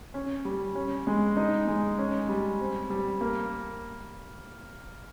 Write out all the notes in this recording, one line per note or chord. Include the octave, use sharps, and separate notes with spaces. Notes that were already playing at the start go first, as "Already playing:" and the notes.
C#4
G3
C#4
G#3
D#4
G#3
C#4
G3
C4
G3
A#3